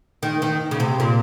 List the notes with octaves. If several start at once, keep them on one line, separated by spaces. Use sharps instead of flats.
D#3
D#3
C#3
C3
A#2